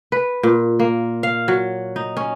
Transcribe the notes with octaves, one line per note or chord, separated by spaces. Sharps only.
B4
A#2
A#3
F5
F#3
D#4
C#4